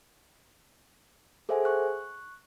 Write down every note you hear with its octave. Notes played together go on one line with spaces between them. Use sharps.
G#4 A4 C5 E5 F#5 G#5
C#6 F#6